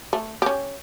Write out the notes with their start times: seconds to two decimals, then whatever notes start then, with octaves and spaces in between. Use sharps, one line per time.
0.13 A3
0.42 C#4 G4